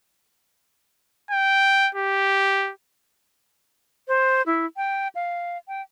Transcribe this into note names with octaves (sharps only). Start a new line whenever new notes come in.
G5
G4
C5
E4
G5
F5
G5